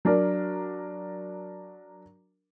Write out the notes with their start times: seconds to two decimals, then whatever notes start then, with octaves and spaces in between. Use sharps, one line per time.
0.05 F#3 D4 A#4